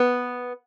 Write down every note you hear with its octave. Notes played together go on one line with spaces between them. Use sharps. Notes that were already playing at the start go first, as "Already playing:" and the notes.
Already playing: B3